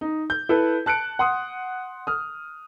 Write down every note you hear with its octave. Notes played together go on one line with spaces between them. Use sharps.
D#4
G6
E4 A4 B4
A5 F#6 C#7 D7
F#5 C6 D#6
D#6 F6